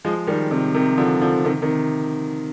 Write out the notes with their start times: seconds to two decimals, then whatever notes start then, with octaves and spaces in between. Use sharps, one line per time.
0.05 F3 G#3
0.27 D#3 G3
0.51 C3 D#3
0.74 C3 D#3
0.98 D3 F3
1.21 D3 F3
1.45 C3 D#3
1.62 C3 D#3